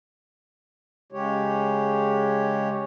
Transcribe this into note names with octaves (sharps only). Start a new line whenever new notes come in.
C#3 G#3 G4 C#5